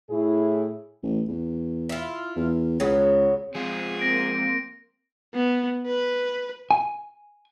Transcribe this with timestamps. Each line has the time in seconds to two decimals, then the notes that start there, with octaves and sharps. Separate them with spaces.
0.10 A2 E4 G#4
1.03 A1
1.28 E2
1.89 E4 F4
2.36 E2
2.80 C#2 C#3 F#3 B3
3.55 F3 G#3 C4 F4 G#4
3.99 A#3 C4 A#6 D7
5.33 B3
5.86 B4
6.71 G#5